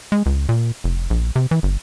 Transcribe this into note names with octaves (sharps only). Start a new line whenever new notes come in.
G#3
C#2
A#2
F1
A#1
C3
E3
G1